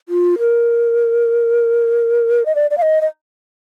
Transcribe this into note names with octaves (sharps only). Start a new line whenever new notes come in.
F4
A#4
D#5
D5
D5
F5
D#5
D#5